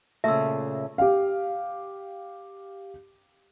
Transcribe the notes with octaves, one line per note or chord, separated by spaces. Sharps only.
A#2 C#3 A3 E5 E6
G4 F5